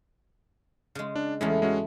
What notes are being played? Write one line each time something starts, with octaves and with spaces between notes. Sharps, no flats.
C#3 G#3
D4
E2 G#3 A3 C#4 E4
G#3 C#4 F#4